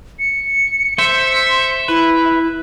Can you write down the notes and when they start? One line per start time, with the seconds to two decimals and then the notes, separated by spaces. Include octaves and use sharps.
0.19 C#7
0.99 C5 E5
1.88 E4 B4